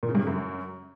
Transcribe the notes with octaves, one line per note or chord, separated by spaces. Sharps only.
A#2
C#3
G2
C#3
F#2